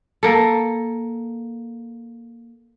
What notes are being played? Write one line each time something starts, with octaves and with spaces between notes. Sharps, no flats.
A#3 A4